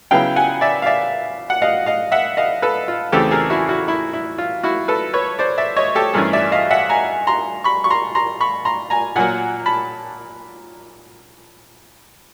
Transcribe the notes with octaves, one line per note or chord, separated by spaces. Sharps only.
C#3 F#3 B3 E4 F5 G5
F#5 G#5
D5 E5
F5
D5 E5
F#5
D#5 F5
D#5 F5
E5 F#5
D#5 F5
A4 B4
F4
E2 C#3 E3 A3 C4 G4 A4
G#4 A#4
E4 F#4
E4 F#4
E4
E4
F4
E4 F#4
A4 B4
B4 C#5
C5 D5
D5 E5
C#5 D#5
G4 A4
G2 E3 A3 C#4 G#4 A#4
D5 E5
D#5 F5
E5 F#5
G#5 A#5
A#5 C6
B5 C#6
C#6
A#5 C6
A#5 C6
B5 C#6
A#5 C6
G#5 A#5
A#2 F#3 A#3 F#5 G#5
A5 B5